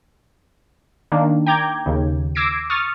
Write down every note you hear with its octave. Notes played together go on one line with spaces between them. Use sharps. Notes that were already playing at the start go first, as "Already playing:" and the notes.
D#3 A#3 D4
G5 A#5 D6 G6 G#6
D#2 C#3
D6 E6 G#6 A#6 C7 D7
C#6 D#6 F6 A6